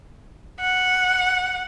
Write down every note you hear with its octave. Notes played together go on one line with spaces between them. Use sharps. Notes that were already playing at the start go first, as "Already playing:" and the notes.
F#5